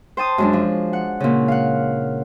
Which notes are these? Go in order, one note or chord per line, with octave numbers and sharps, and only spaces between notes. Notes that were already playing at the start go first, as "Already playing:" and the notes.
C5 G5 A5 D#6
F#2 G#3 D4
F3
F#5
A#2 C#3
F5 F#5